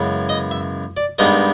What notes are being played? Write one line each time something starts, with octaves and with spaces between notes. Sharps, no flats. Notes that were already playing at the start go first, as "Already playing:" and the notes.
Already playing: F#2 C#3 E3 G#3 B3
D#5
E5
D5
G2 D#3 G#3 B3 D#5